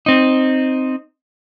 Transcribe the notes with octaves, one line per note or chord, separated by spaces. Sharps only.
C4 D#4